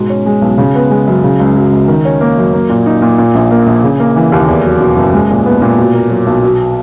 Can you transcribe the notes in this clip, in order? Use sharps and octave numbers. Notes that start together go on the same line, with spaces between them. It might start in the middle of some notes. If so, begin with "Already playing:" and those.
Already playing: G#2 B2
C#4
G#3
B1
C#3
B3
G#3
F#2
C#3
C#2
F#3
C#2
D#3
C#4
A#3
F#2
A#3
A#2
D#4
A#2
A#2
A#1
A#3
A#1
C#3
A#3
E3
D#2
E2
F#3
B2
F#1
G#3
A#2
B3
A#2
B2
A#3
F#3
B1
B2